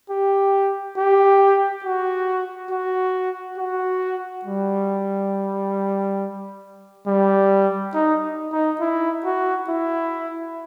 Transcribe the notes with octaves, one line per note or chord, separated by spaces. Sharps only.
G4
G4
F#4
F#4
F#4
G3
G3
D#4
D#4
E4
F#4
E4